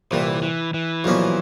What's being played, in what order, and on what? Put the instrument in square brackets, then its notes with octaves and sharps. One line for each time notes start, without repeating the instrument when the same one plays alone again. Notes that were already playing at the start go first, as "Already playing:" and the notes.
[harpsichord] C2 A#2 G3 [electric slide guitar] E3
[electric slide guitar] E3
E3
[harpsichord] B1 A#2 F3 A#3 C#4